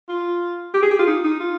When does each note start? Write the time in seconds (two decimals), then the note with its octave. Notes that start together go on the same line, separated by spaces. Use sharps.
0.09 F4
0.74 G4
0.82 G#4
0.91 G4
0.99 F4
1.07 D#4
1.24 D#4
1.40 F4